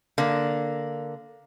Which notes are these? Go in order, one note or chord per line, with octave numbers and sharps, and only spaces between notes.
D3 A#3